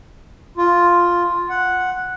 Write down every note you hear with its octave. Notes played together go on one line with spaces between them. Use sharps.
F4
F#5